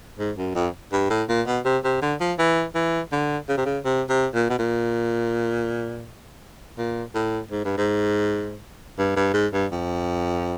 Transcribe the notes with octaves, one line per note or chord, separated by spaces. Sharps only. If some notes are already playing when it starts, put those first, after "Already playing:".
G#2
F#2
F2
G2
A2
A#2
B2
C3
C3
D3
F3
E3
E3
D3
C#3
C3
C#3
C3
C3
A#2
B2
A#2
A#2
A2
G#2
G2
G#2
G2
G2
G#2
G2
F2